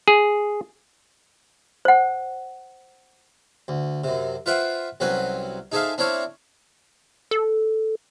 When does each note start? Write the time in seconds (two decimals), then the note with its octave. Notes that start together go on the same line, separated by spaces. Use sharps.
0.08 G#4
1.85 C5 F#5
3.68 D2
4.04 F#2 C3
4.46 F4 B4 C5 E5 F#5 G5
5.00 C2 F#3 C4 C#4 B4 F#5
5.72 D#4 G#4 A4 C5 E5 F5
5.98 C4 D4 E4 C5 C#5 F5
7.31 A4